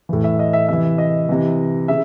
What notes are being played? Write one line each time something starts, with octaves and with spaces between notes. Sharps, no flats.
A2 E3
E5
D#5
E5
C3 E3 E5
D#5
C3 E3
C#3 E5